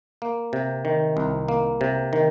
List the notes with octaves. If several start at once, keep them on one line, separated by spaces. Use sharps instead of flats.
A#3
C3
D#3
C2
A#3
C3
D#3